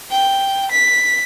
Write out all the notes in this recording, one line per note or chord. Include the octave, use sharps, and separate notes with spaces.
G5
B6